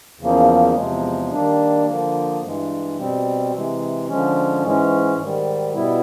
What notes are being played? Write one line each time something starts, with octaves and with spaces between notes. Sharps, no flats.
E2 C#3 F3 A#3
E2 C3 F3 G#3
D#3 G3 A#3 D4
D3 F3 A#3
G2 E3 G#3
B2 G3 C4
C3 E3 G#3
D3 F3 G#3 C#4
G#2 E3 G#3 C#4
G#2 D#3 G3
B2 G3 B3 E4